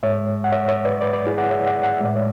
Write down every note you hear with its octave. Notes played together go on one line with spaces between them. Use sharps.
G#2 G#3 C#5 E5
F#5
C#5 E5
C#5 E5
B4 D5
B4 D5
B4 D5
E4 G#4
D5 F#5
C#5 E5
D5 F#5
F#5
E5
A2 G#3 D5
C#5 E5